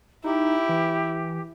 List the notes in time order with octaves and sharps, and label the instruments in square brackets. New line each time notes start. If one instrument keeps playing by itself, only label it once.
[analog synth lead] D#4 [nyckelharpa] E4 [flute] G4
[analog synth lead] E3